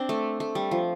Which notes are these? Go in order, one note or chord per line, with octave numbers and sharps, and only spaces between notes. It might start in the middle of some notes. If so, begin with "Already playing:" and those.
Already playing: C4 D4
A3
A3
G3
F3